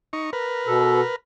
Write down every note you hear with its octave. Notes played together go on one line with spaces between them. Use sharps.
D#4 C#6
A#4 B4
B2 A4